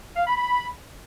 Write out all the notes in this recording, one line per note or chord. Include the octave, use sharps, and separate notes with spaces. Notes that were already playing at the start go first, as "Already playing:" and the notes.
F5
B5
B5